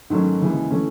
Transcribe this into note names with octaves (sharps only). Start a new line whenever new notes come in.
G#2 D#3 F#3 A3 C#4
D#2 C#3 E3 G#3
E3 A3 C#4